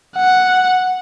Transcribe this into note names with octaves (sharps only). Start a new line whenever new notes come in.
F#5